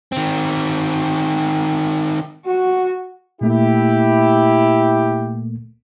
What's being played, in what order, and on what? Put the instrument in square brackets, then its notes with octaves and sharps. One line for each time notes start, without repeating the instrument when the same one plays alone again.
[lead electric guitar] D#3 C4
[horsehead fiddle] F#4
[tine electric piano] A#2 A3 A#3 [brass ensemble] E4 G4